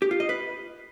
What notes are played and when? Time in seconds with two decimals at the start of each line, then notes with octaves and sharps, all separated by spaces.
0.02 G4
0.11 F4
0.20 D#5
0.29 B4